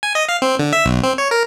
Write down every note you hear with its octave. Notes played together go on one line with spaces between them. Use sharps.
G#5
D#5
F5
C4
D3
E5
B1
C4
C#5
A#4